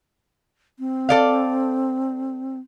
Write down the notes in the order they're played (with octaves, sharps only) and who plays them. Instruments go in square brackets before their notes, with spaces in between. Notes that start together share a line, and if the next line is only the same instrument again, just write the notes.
[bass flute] C4
[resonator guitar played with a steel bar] A4 D5 F5